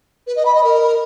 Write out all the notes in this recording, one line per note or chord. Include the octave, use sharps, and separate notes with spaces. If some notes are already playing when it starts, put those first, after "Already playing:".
B4
D#5
B5
D#5
A#4